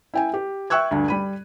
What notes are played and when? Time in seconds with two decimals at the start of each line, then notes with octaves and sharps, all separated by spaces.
0.14 E4 G5 G#5
0.34 G4
0.70 E5 G5 C#6 E6 F#6 G#6
0.91 D2 G2
1.08 G3 B5 D#7